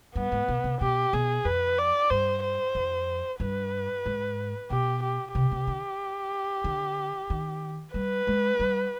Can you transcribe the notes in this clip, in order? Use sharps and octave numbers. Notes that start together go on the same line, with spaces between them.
G2 B3
G#2
B2
C3
B2 G4
B2 G#4
F2 B4
D5
G2 C5
C5
F2
G2 B4
G#2
B2 G4
G4
C3 G4
C3
D3
D3
D#3
G3 B4
G#3
G3